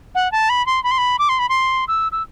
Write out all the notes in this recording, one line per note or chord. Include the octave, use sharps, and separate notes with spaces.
F#5
A5
B5
C6
B5
C6
B5
D6
C6
B5
C6
E6
E6